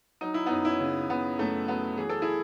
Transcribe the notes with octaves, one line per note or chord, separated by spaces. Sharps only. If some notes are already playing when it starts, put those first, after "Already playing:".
F#3 D#4
E4
F#2 B3 D#4
C#4 E4
C#3
C#3 B3
F#2 A3
F#3 B3
E3 G#4
A4
E4 G#4